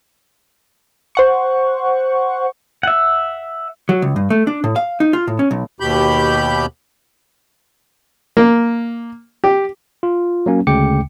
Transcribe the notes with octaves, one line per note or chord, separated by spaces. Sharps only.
C5 F#5 C#6
E5 F#5
F#3
C#2
G2
A3
D4
A2
F5
D#4
F4
A2
C#4
B1
D#2 B2 G4 B5 G6
A#3
G4
F4
F#3 A#3 C#4
D2 C#3 G#3 G5 D6 C#7